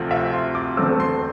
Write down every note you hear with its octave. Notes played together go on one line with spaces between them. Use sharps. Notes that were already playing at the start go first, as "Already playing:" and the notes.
Already playing: D2 C3 F3 A3
E5
C6
D6
E1 E2 D3 A3 C4 E6
C6